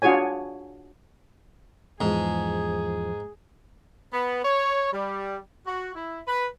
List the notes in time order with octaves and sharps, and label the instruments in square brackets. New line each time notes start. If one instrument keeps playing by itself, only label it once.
[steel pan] D4 F4 F#4 G#4 C#5 G#5
[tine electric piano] E2 E3 F3 [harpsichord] G#2 [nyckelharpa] G#4
[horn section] B3
C#5
G3
F#4
E4
B4